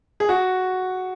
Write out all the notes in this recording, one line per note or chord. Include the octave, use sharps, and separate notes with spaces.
G#4
F#4